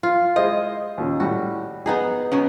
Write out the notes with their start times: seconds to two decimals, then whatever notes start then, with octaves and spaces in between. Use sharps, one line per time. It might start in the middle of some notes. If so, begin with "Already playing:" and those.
0.03 F4
0.36 G#3 E4 C5 D#5
0.98 D#2 A#2 C#3
1.20 A2 G3 F#4
1.86 B3 D#4 G#4
2.32 B2 F#3 C#4